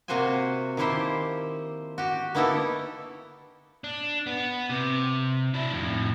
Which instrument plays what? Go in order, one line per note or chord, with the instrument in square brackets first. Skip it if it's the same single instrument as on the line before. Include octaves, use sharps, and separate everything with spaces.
[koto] C3 A#3 C4 F#4 C5 G#5
D#3 F3 A#3 E4 G4 C5
F#4 G4
A#3 B3 D#4 E4 G4 A4
[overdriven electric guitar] D4
B3
C3
D4 E4
F2 A2